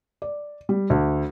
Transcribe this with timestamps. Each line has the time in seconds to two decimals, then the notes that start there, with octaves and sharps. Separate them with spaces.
0.22 D5
0.69 G3
0.90 D2